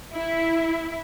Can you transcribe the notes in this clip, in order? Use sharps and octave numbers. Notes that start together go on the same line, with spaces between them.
E4